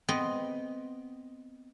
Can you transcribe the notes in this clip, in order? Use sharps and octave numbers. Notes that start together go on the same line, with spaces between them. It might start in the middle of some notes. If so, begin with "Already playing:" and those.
B3 C4 D#5